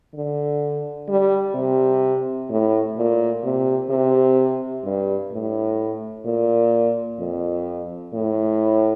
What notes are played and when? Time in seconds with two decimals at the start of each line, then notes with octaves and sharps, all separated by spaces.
0.14 D3
1.09 G3
1.55 C3
2.50 A2
2.97 A#2
3.44 C3
3.90 C3
4.84 G2
5.32 A2
6.26 A#2
7.19 F2
8.14 A2